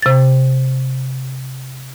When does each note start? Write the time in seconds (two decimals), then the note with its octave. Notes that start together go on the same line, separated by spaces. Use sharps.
0.02 C3 A6